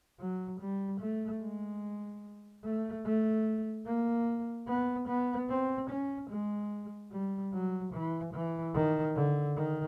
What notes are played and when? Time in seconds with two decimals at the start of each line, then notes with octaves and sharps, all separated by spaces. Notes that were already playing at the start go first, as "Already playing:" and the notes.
0.20 F#3
0.60 G3
1.01 A3
1.42 G#3
2.64 A3
3.05 A3
3.86 A#3
4.67 B3
5.08 B3
5.49 C4
5.89 C#4
6.30 G#3
7.12 G3
7.53 F#3
7.93 E3
8.33 E3
8.74 D#3
9.15 D3
9.56 D#3